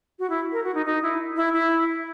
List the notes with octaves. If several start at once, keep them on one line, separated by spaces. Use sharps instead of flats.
F#4
E4
A#4
F#4
D#4
D#4
E4
E4
E4